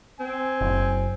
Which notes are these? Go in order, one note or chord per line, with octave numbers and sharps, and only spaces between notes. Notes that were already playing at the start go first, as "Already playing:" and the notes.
C4 G#5
F#1